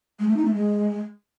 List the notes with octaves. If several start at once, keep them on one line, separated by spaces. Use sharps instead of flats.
G#3
A3
D#4
A3
G#3